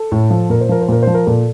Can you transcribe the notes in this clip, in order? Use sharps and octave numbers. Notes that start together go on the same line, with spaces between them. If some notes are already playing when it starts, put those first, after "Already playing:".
Already playing: A4
A2
F3
A#2 A#4
C5
F3 A#4
C5
A#2 A#4
F3 C5
A#4
A#2 A4